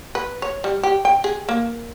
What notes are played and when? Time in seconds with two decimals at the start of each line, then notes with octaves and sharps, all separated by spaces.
0.15 B4
0.42 C#5
0.64 G3
0.83 G4
1.05 G5
1.24 G#4
1.49 A#3